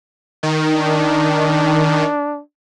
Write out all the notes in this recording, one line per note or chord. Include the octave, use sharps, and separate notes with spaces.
D#3
D4